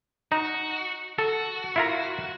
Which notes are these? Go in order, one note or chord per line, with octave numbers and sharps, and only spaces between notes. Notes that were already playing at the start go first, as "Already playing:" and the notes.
D#4 F#4
F#4 A4
E4 F4 A#4